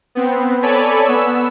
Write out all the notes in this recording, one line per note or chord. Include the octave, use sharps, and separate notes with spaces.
B3 C4
A4 C#5 D5 G#5 B5
B3 E6